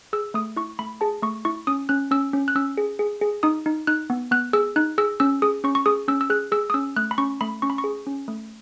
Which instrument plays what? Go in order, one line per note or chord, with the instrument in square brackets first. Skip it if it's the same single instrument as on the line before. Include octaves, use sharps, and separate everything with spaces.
[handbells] G#4 E6
A3 D#6
E4 C#6
A3 B5
G#4 A5
A3 C#6
E4 C#6
C#4 D#6
C#4 F#6
C#4 E6
C#4
F#6
C#4 E6
G#4
G#4
G#4
D#4 D#6
D#4
D#4 F#6
B3
B3 F#6
G#4 E6
D#4 F#6
G#4 E6
C#4 E6
G#4 D#6
C#4 C#6
C#6
G#4 D#6
C#4 E6
E6
G#4 F#6
G#4 E6
D#6
C#4 E6
A3 F#6
B5
C#4 C#6
A3 B5
C#4 C#6
B5
C#6
G#4
C#4
A3